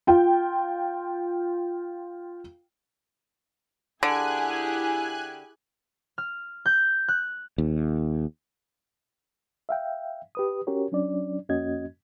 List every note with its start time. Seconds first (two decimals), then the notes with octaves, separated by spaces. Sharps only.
0.07 F4 G5
4.03 D3 E4 G4 G#4 G#5 F#6
6.18 F6
6.66 G6
7.08 F#6
7.58 D#2
9.69 E5 F5 G5
10.35 G4 B4 D#6
10.67 C#4 F#4 G4 A#4 C#5
10.92 F#3 C#4 D4 D5
11.49 F2 A#3 C#4 F#4 D#5 G#6